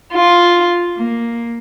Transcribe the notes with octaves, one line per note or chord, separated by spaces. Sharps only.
F4
A#3